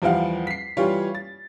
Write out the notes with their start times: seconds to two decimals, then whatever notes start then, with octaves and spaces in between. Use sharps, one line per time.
0.02 E2 F3 G3 G4 F5 F#5
0.47 B6 C7
0.77 E3 G3 F4 G4 C#5
1.15 A6